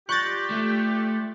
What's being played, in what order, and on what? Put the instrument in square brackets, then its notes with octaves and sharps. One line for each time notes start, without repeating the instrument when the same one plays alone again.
[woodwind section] G3 F4 G4 [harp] C#6 A#6 [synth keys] F#6 G6 A6
[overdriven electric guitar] A3